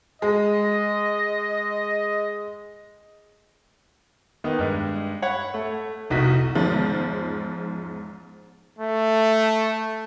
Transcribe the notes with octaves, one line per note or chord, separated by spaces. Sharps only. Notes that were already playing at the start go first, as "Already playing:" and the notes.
G#3 D#5
D#3 A#3 B3 D#4
G2 G#3
C#5 F#5 B5
A3
F1 C2 D#4 F#4 B6
E2 G#2 F3 G#3 C#4 D#4
A3